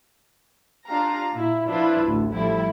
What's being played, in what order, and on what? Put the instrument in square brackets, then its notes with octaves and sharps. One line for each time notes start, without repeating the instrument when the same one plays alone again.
[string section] D4 F4 G4 F5 A#5
A#2 E4
F3 D4 E4 F4 B4
A1 D2
F3 G3 A3 E4